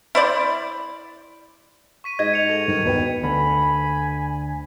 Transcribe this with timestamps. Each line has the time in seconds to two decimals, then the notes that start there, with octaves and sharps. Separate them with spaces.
0.15 E4 C5 D5
2.04 C#6 B6 D#7
2.19 G#2 D#5 G#6
2.34 C#7 F7
2.49 A4
2.68 G2 D#3
2.85 D#2 B2 B4 G5
3.23 D2 D3 G#5 B5